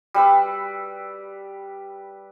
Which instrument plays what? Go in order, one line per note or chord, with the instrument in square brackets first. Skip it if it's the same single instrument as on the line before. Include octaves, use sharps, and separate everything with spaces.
[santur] G3 B4 E6